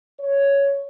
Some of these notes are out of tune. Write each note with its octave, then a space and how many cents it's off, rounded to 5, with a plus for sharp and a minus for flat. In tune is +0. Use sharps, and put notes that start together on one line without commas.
C#5 +5